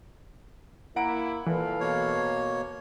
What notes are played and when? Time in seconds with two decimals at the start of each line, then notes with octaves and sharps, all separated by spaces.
0.96 A#3 E4 F#5 A#5 D7
1.47 A#2 E3 A4 B4 F5
1.80 B2 A#3 C#5